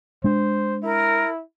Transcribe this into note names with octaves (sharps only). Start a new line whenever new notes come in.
G#3 D4 C5
E4 A#4